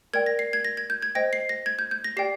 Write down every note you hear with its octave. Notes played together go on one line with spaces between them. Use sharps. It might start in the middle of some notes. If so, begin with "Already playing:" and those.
A#4 D5 G5 G#6
A#6
C7
G#6
A#6
G#6
G6
G#6
C5 D#5 G5 A#6
C7
A#6
G#6
G6
G6
A#6
G4 D5 G5 C7